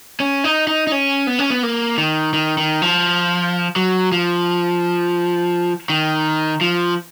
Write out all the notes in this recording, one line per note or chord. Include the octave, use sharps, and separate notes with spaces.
C#4
D#4
D#4
D#4
C#4
B3
C#4
B3
A#3
D#3
D#3
D#3
F3
F#3
F3
D#3
F3